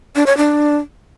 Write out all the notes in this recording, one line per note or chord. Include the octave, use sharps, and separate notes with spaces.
D4
C#5
D4